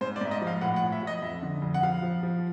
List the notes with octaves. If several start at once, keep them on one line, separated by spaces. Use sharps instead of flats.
G#2 C5
D5
G#2 E5
D#5
F3
F5
A2 F#5
F#5
A2
E5
F3 D#5
F2 E5
D3
F2
F#5
F3 F5
F3
F3